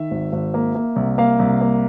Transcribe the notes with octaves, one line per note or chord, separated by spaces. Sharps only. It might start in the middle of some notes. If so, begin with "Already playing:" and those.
Already playing: D#3 E5
G#1
G#1
A#3
A#3
C2
A#3 F5
C2
A#3